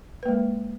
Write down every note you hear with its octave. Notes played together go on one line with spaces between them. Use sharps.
G#3 A#3 B4